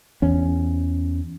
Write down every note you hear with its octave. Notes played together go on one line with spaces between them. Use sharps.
E2 C#4